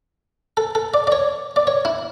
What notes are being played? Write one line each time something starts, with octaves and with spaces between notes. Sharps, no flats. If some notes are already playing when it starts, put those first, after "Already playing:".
A4
A4
D5
D5
C#5
D5
C#5
E4